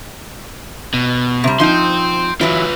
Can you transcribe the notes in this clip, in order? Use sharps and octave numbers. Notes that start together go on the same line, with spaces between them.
B2
C3 G3
F3 D#4 G5 C6
E3 F#3 F4 B4